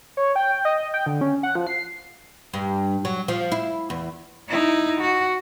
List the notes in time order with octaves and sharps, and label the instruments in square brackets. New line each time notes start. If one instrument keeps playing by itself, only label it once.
[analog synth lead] C#5
G5
D#5
G5
D3
C#4
F#5
F3
C7
[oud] G2
F#3
F3
E4
E2
[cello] D#4 E4
F#4